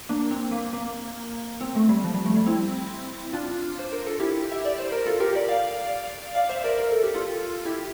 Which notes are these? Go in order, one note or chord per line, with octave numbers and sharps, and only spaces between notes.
A#3 D4
C4
A#3
A#3
C4
A3
G3
F3
G3
A3
G3
C4 E4
D4 F4
C5
A#4
A4
E4 G4
E5
D5
C5
A#4
F4 A4
G4 A#4
A#4 D5
D5 F5
D5 F5
C5 E5
A#4 D5
A#4
A4
G4
F4 A4
E4 G4